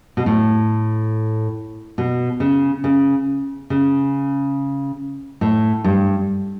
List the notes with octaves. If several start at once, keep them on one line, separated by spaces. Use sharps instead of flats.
B2
A2
B2
C#3
C#3
C#3
A2
G2